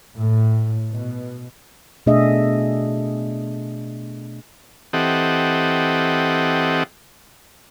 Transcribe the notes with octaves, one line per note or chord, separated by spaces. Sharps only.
A2
B2
B2 A3 D4 G#4 D#5 E5
E3 C4 G4 A4 D#5 F#5